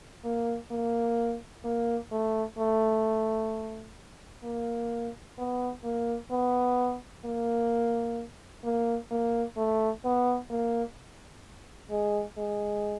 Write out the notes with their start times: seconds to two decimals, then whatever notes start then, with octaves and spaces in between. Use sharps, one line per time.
0.25 A#3
0.71 A#3
1.65 A#3
2.11 A3
2.59 A3
4.44 A#3
5.38 B3
5.84 A#3
6.31 B3
7.25 A#3
8.64 A#3
9.11 A#3
9.57 A3
10.05 B3
10.51 A#3
11.91 G#3
12.38 G#3